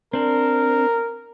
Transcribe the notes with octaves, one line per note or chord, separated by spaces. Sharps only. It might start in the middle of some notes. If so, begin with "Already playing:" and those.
C4 D4 A#4